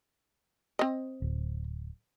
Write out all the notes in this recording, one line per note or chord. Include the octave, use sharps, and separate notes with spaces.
C4 D#5
D1